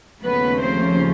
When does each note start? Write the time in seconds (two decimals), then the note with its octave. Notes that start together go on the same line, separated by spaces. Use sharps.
0.23 D#2 C#3 F3 A3 B3 C#4 B4
0.61 C4 C5